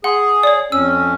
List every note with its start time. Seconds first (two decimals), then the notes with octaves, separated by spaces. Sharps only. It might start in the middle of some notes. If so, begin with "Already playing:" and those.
0.04 G#4 F#5 C6
0.43 C#5 D5
0.72 F2 C#4 E6